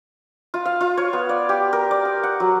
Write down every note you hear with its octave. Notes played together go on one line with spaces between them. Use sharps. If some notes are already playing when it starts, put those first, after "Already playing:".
F4
F5
F4
C#5
B3
D5
G4
A#4
D5
D#6
F#5
F#3